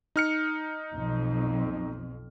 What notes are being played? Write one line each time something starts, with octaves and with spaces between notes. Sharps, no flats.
D#4 F6 C#7
B1 F2